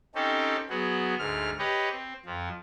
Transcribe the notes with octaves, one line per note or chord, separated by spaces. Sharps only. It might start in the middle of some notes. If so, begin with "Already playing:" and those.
C4 C#4 D#4 G4 A4
F#3 B3 F#4 G#4
D2 G#2 F6
G4 B4 C#5 D#5
C4
F2 F3